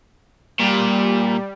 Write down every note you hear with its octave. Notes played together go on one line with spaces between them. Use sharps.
A#2 G3